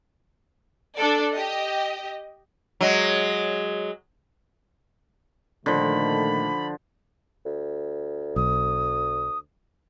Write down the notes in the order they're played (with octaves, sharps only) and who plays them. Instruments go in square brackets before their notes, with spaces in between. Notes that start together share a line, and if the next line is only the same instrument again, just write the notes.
[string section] D4 A4 D5
G4 D#5
[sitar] F#3 G#3
[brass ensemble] A#2 D#3 A3 [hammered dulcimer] D3 F3 [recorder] B5
[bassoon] D2
[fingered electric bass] B1 [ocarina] D#6